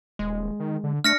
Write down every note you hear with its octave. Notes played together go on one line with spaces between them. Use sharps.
D#1 G#3
D#3
D3
A3 D4 F6 A#6 C#7